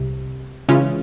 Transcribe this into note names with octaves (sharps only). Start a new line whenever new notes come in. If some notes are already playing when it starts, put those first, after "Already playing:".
Already playing: C2 C3
C#3 E3 G#3 C#4 F4